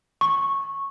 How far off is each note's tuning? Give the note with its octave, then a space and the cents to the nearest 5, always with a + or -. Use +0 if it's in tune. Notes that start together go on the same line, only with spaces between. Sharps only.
C#6 -10